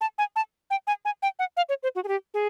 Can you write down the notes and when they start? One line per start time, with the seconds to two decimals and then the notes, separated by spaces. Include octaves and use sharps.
0.01 A5
0.18 G#5
0.36 A5
0.70 G5
0.87 G#5
1.05 G#5
1.23 G5
1.39 F#5
1.57 F5
1.69 C#5
1.83 C5
1.95 F#4
2.04 G#4
2.08 G4
2.34 G#4